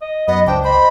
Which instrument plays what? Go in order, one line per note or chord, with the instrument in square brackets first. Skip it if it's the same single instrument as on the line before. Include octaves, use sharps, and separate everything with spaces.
[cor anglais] D#5
[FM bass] F#2 [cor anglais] B3 [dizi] D#5
[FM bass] C#2 [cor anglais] D4 [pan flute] C5 [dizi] G5
[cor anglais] C5 [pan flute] D#5 [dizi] B5